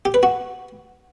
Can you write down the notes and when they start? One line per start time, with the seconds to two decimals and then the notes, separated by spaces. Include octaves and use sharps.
0.05 G4
0.14 B4
0.23 F#4